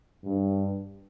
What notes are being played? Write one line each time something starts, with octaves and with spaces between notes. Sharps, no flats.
G2